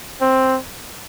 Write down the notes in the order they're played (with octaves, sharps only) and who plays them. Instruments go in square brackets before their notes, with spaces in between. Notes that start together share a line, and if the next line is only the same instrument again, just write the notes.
[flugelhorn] C4